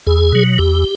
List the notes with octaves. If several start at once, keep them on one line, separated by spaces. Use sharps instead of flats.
E2 G#4
B2 F#3
E2 G4